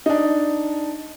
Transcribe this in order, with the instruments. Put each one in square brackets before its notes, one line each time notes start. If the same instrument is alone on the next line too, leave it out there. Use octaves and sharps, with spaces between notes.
[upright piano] D4 D#4